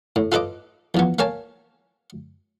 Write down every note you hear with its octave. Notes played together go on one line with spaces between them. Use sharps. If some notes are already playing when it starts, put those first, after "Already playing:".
A2
F4 A4 B4 D#5 D6
E2 F3 B3
A#3 A#4 C#5 G#5 A5